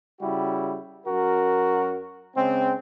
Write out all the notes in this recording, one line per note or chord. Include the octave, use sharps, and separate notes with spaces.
C#3 G3 E4 F#4
F#2 F#4 A#4
C#3 G#3 C4